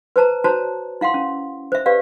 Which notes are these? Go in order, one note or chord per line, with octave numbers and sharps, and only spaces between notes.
B4 C5 A5 A#5
F#4 C5 C#5 A5 A#5
E4 F5 F#5 C6
C#4
C5 E5
G4 B4 D5 F5